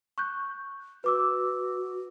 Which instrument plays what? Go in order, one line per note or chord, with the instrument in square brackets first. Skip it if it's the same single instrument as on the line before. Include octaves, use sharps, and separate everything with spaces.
[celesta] C#6 F#6 G6
[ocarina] F#4 [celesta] B4 D6 E6